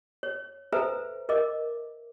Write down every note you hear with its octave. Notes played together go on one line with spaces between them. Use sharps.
C#5
A4 B4 C5 E5 G#5 A#5
A#4 D#5 E5 D6